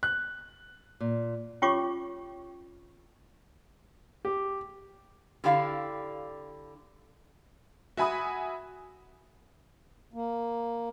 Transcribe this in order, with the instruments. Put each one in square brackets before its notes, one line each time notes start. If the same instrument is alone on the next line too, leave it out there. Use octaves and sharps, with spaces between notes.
[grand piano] F#6
[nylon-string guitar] A#2
[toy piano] C#4 F4 G4 C#5 C#6 D6
[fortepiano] G4
[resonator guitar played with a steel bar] D3 E4 G4 D5 F5
[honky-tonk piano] F#4 E5 G#5 B5 D#6
[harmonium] A#3